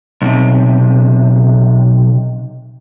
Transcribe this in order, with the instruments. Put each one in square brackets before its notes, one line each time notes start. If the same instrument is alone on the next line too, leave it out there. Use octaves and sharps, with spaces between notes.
[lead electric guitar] B1 C3